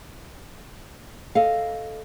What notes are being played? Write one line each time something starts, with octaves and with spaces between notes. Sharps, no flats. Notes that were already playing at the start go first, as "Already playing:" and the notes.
A4 D#5 F5